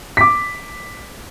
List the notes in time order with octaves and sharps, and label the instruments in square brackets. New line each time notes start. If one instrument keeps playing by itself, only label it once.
[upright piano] D6 B6